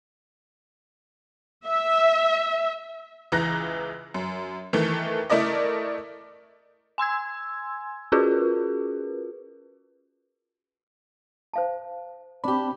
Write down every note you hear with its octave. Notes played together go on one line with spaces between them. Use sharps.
E5
C#2 E3 A#5 F#6 A#6
F#2
D#3 E3 A3
A3 E4 A#4 D5 D#5
G#5 C6 E6 G#6
C#4 F4 F#4 G#4 A#4 B4
C5 F5 A5
C4 D4 G4 B5